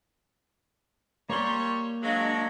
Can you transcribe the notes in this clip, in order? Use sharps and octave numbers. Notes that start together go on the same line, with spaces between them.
G3 A#3 C#5 C6
F#3 G#3 D4 D#5 F5